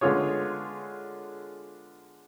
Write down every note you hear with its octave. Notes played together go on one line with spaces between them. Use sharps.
D3 G#3 B3 F4 G#4 C#5